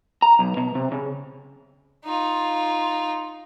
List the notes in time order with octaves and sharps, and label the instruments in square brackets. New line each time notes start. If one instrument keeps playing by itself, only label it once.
[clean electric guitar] A#5
B1
B2
C3
C#3
[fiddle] D#4 F4